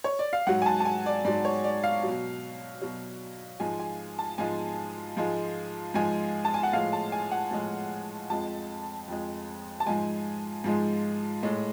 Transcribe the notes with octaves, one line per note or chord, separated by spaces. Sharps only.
C#5
D5
F5
G#2 F#3 F#5
G#5
A5
A5
G#5
D5
G#2 F#3 D5
C#5
D5
F5
B2 F#3
B2 F#3
G#2 F3 G#3 G#5
G#5
A5
G#2 F3 G#3 G#5
G#2 F3 G#3
G#2 F3 G#3 G#5
A5
G#5
F#5
A2 F3 G#3 F5
A5
G#5
F#5
A2 F3 G#3
F2 F3 G#3 A5
F2 F3 G#3
A5
G#2 F3 G#3 G#5
G#2 F3 G#3
A2 G#3